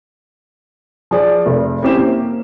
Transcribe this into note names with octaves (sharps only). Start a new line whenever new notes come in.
F3 G#4 D5
F1
C4 C#4 E4 G4 C5 E7
A#3